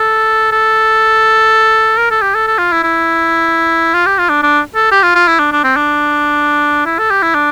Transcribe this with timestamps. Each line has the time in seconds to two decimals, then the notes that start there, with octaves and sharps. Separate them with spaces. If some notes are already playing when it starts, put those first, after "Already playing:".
Already playing: A4
0.52 A4
1.98 A#4
2.11 A4
2.22 G4
2.35 A4
2.47 A4
2.59 F4
2.72 E4
2.83 E4
3.94 F4
4.06 G4
4.18 F4
4.29 D4
4.43 D4
4.75 A4
4.92 G4
5.03 F4
5.15 F4
5.27 E4
5.39 D4
5.52 D4
5.64 C4
5.76 D4
6.86 E4
6.98 A4
7.10 G4
7.22 E4
7.35 D4